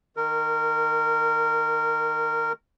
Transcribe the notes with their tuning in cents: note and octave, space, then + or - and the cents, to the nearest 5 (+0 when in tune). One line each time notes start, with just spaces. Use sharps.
D#3 +0 A#4 -20